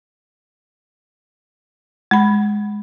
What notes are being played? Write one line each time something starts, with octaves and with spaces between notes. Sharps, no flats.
G#3 B5